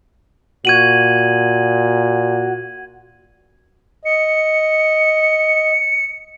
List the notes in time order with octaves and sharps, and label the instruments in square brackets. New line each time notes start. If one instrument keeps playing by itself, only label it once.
[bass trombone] A#2 [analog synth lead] F#4 [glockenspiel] G#6 D#7 F#7
[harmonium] D#5 [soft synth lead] C#7